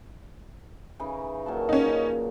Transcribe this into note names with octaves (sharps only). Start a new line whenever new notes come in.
C#3 E3 D#4
A#2 F#3 A5
C#4 D#4